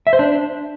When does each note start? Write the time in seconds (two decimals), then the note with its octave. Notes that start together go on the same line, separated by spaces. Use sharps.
0.07 E5
0.13 C5
0.19 D4